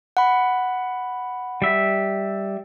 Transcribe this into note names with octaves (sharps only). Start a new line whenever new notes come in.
F#5 B5
G3 E5